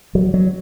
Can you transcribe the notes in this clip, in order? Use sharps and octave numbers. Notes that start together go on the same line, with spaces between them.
F#3
F#3